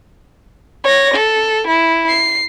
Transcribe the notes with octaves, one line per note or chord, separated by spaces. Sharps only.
C#5 A#6
A4
E4
C7